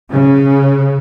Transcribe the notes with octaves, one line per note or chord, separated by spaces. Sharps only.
C#3